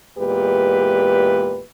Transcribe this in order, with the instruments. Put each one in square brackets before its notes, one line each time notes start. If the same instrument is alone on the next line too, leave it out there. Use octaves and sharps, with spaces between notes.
[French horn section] E2 A#2 G#3 G4 B4